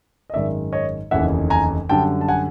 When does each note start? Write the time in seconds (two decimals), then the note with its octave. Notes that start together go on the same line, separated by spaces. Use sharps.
0.30 D#5
0.34 G#1 F#2 D#3 G#3 D5 E5
0.72 C#5 D#5
1.11 F1 D#2 C#3 E3 E5 F#5
1.50 G#5 A#5
1.89 F#2 D3 G3 G5 A5
2.21 A5
2.28 F#5 G#5